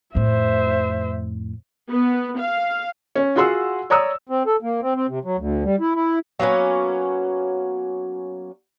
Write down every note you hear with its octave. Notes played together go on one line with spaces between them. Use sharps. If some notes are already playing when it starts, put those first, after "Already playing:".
F2 A2 C5 E5
B3
F5
C#4
F4 F#4 G#4 F#5 C6 E6
C#5 D5 A#5 D#6 E6
C4
A4
A#3
C4
C4
C3
F#3
D2
G3
E4
E4
F#3 A#3 B3 C#4